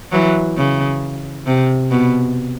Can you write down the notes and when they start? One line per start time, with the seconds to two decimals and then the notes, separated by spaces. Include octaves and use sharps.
0.12 E3 F#3
0.57 C#3
1.47 C3
1.91 B2